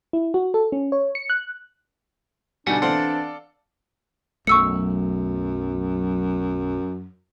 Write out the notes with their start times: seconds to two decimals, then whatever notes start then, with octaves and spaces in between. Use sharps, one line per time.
0.13 E4
0.34 F#4
0.54 A4
0.72 C#4
0.92 C#5
1.15 C#7
1.30 F#6
2.67 B2 D3 G3 D4 D#4 F#5 G#5
2.82 E3 C4 A4 D5 F5 F#5 C6
4.47 B1 F#2 A3 C#6 E6 C#7